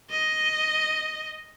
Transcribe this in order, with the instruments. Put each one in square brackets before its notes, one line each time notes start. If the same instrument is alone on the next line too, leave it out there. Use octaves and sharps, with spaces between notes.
[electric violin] D#5